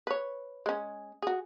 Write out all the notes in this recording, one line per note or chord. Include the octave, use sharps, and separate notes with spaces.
B4 C#5
G#3 C#4
F#4 G#4